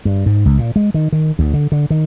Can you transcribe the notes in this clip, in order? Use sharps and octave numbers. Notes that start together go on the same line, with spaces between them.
G2
G#2
C#2
A#2
G#3
D#3
D#3
D2
D3
D3
D#3